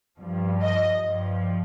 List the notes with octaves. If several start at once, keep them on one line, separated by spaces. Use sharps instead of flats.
G2 F3
D#5
G2 F3